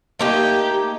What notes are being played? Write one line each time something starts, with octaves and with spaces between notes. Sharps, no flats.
A3 A#3 D#4 G4